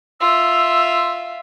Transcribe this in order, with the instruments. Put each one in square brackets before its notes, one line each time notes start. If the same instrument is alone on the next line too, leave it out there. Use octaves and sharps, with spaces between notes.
[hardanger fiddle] F4 E5 [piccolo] E6